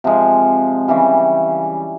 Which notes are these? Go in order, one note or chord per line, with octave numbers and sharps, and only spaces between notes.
C3 F3 G#3
C#3 E3 G3